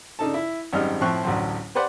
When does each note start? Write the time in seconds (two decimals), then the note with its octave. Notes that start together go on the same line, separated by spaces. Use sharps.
0.19 C#3 D4 D#4 A4 A5
0.34 E4
0.73 G#1 F#2 G3 D#4 D#5 F6
1.01 A2 F3 C4 E4 C#6 F#6
1.24 A1 D2 A2 F#3 C5
1.75 G4 B4 C5 D5 F#5